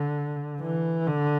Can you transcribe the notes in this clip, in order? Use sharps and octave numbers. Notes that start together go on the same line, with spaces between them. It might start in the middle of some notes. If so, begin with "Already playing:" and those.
Already playing: D3
E3
D3